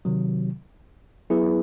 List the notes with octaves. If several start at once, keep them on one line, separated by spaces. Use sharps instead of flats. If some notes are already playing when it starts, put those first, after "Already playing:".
C3 D#3 F#3
F#3 B3 E4 G#4 B4